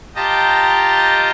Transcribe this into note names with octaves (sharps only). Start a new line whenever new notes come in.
F4 G4 D#5 G5 A5 A#5